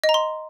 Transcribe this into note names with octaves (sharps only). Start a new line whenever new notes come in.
D#5
A#5
C6